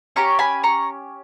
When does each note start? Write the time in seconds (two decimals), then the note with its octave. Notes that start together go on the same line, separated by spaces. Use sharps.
0.16 C#4 G4 A#5 C#6
0.39 G#5 B5
0.63 A#5 C#6